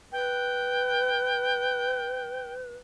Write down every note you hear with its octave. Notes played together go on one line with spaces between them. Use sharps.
B4 G5